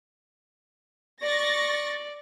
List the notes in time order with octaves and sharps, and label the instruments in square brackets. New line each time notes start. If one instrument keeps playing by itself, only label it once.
[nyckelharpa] D5 [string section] C#6 A6 A#6